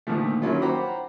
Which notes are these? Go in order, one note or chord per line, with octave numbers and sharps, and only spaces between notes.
A#2 D3 D#3 F3 A3
D#3 F#3 A#3 C#4 E4 F4
C5 F#5 G5 A#5 B5 D6